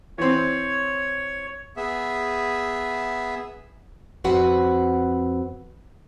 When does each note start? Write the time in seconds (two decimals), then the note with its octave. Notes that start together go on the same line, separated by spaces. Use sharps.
0.18 E3 C4 C#5
1.77 B3 G#4 E5
4.24 F2 C4 F#4 B4 F#5